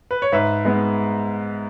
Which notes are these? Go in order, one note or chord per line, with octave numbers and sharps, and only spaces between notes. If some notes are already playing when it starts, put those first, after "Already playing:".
B4
C#5
G#2 B4 E5
G#3 B3